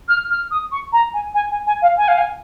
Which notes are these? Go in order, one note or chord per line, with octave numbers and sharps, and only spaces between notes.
F6
F6
D#6
C#6
A#5
G#5
G#5
G#5
G#5
F5
G#5
F5
G#5